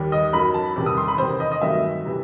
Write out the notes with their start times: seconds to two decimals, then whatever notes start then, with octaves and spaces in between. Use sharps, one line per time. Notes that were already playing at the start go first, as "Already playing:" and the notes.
Already playing: D#2 D#3 G3
0.12 D#5
0.33 F#2 D#3 F#3 B5
0.54 A5
0.76 E2 C3 D#3 G3
0.86 D#6
0.97 C6
1.08 B5
1.18 E2 C3 D#3 C5
1.40 D#5
1.52 D#5
1.62 G2 D#3 F#3 A3 E5
2.06 C3 E3 G3